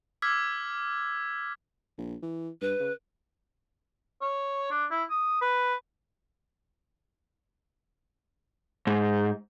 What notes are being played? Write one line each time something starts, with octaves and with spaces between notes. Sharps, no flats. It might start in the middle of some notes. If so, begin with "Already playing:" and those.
D6 E6 F6 G#6 B6
A#1
E3
G2 B4
C#3
C#5
D4
E4
D#6
B4
G#2